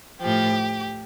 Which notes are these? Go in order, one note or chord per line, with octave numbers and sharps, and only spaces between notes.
A2 F3 G4